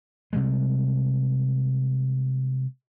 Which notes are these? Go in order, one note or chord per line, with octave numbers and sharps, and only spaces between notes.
C3 G3 G#3